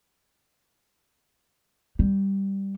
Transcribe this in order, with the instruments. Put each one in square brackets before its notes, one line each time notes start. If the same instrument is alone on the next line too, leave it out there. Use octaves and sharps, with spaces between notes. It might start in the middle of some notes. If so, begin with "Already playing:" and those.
[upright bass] G3